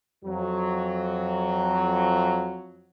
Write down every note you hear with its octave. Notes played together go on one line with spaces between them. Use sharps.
F2 F#3